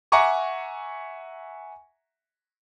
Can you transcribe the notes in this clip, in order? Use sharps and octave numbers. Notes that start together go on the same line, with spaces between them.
E5 F#5 G#5 A#5 C#6 D6